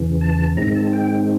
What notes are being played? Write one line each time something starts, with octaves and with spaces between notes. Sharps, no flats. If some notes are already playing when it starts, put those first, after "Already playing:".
Already playing: E2 C#3 E3
A5
G#2 D#3 G#3 C4 A#5
A5
G5